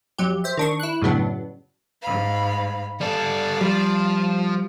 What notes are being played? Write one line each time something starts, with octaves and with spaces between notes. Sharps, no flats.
F2 F#3 G4
C5 E5
D#3 D4 C#6
E4 F#6
F#2 A2 C#3 F#3 B3 D4
G#2 F5 B5
G3 A4 D5 F5
F3 G3